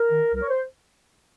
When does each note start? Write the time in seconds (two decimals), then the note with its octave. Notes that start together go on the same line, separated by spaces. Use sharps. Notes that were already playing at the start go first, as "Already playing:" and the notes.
Already playing: A#4
0.11 D#3
0.33 C2 A#4
0.42 C#5
0.49 C5